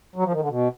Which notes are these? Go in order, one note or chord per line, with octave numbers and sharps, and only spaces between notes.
F#3
F3
D#3
D3
B2